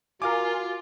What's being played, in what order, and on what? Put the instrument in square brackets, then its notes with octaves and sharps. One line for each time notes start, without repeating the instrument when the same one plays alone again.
[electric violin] F4 [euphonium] F#4 [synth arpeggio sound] A#4 G#5 [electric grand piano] F5 D6